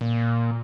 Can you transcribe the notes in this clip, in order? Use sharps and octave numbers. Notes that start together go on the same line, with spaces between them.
A#2